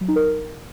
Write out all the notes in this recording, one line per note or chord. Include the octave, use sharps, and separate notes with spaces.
F#3
D#4
A#4